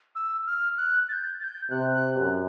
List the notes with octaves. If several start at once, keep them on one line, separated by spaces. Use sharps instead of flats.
E6
F6
F#6
A6
G6
A6
G6
C3 F#6
F#6
F#2